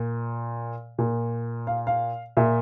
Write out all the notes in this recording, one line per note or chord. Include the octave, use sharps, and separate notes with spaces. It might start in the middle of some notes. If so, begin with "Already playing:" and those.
Already playing: A#2
A#2
F5
F5
A#2 E5